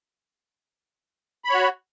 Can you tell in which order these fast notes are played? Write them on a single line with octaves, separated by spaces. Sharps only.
B5 C#5 F#4